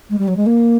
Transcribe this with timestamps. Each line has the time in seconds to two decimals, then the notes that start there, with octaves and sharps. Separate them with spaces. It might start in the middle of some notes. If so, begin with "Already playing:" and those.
0.10 G#3
0.19 G3
0.28 F#3
0.37 G#3
0.46 A#3